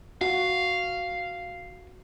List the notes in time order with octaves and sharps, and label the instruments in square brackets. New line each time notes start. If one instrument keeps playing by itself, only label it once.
[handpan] F#4 [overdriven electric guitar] F5